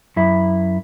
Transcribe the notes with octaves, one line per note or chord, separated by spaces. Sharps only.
F#2 E4 E5